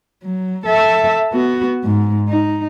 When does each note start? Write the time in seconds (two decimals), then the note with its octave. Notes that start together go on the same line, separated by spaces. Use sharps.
0.23 F#3
0.66 A4 E5
1.32 B3 F#4
1.84 G#2
2.29 D#4